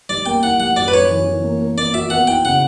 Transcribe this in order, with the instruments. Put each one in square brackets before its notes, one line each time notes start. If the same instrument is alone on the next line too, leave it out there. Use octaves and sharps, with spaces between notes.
[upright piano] G3 [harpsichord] D5
[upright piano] A#3 [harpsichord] G5
[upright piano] E4 [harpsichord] F#5
[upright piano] G3 [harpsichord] F#5
[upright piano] F#2 [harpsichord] D5
[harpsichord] B4
[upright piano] F#2 [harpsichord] C#5
[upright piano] E3
E3
A#3
A#3
[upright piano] A#3 [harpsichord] D5
[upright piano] F#4 [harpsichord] E5
[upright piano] B3 [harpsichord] F#5
[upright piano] E4 [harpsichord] G5
[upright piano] C#3 [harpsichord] F#5